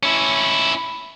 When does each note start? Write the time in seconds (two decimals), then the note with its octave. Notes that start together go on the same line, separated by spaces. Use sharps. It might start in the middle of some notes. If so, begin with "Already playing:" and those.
0.03 C#4 E4